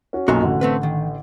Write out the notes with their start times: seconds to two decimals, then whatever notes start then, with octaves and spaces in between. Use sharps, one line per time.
0.13 C#4 F#4
0.28 B1 F#2 A#2 F#4 A#5 C6
0.43 A1 D3
0.61 A3 C4 B4
0.83 D#3